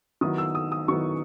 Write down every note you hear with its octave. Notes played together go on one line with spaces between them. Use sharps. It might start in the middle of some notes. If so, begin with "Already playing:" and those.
D#3 F#3 B3 E4 D#6
E6
D#6
D#6
D#3 F#3 B3 E4 C#6